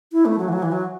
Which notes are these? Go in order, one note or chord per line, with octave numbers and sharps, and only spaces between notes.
E4
A3
F#3
E3
F#3
E3
F#3